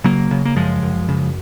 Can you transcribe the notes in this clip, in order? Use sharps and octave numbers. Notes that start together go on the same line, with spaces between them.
C#3 F#3 A#3
C#3
A#3
F#2 F3 G#3
F#2
C#3